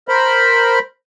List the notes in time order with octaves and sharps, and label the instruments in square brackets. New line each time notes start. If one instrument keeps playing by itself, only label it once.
[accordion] A#4 C5 B5